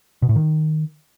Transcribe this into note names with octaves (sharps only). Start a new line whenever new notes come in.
B2
A2
D#3